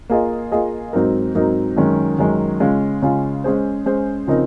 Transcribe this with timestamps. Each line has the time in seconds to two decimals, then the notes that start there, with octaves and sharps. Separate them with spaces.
0.10 A#3 F4 G#4 D#5
0.52 A#3 F4 G#4 D#5
0.93 G#2 F#3 C4 D#4 A#4
1.35 G#2 F#3 C4 D#4 A#4
1.77 F#2 D#3 G#3 C#4
2.19 F#2 D#3 G#3 C#4
2.60 C#3 G#3 C#4 F4
3.02 C#3 G#3 C#4 F4
3.44 G#3 C#4 G#4 C5
3.86 G#3 C#4 G#4 C5
4.27 C#3 F3 C4 D#4 A#4